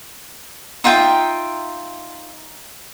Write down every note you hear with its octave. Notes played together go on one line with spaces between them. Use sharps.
D#4 F4 E5 G5